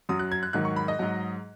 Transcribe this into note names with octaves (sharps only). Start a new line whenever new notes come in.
F#2 F#3 D#6
F#6
G#6
F#6
G#2 D#3 F#3 F#6
C#6
B5
D#5
G#2 F#3